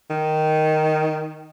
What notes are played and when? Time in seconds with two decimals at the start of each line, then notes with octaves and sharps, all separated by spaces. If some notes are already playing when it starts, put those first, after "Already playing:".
0.10 D#3